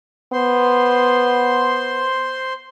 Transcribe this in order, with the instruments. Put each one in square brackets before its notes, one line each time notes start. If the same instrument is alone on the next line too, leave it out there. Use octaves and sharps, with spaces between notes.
[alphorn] B3 [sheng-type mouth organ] C5 C6